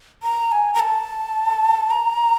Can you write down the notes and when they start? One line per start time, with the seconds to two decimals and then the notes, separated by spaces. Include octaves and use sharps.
0.23 A#5
0.52 G#5
0.74 A#5
0.80 A5
1.91 A#5